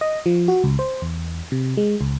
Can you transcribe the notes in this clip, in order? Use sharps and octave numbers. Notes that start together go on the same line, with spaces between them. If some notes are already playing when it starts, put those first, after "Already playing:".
D#5
F3
F#4
C#2
C5
E2
C3
G#3
C#2